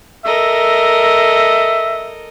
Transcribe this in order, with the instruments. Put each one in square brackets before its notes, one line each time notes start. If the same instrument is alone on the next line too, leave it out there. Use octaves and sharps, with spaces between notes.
[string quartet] A4 A#4 D#5 [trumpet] E5